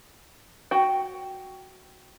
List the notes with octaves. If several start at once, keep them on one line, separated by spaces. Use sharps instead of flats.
F#4 G5